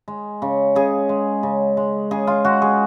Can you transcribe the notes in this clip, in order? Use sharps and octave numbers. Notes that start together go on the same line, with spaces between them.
G#3
C#3
C#3 G#4
G#3
C#3
G#3
C#3 G#4
F4
G#3 F#4
G#4